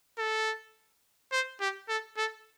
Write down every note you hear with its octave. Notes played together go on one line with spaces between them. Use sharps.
A4
C5
G4
A4
A4